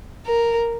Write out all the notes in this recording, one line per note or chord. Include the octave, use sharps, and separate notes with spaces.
A#4